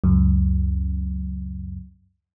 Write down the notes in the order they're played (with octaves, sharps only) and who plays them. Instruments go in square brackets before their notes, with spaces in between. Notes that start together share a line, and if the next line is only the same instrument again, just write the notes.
[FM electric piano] C#2 F#2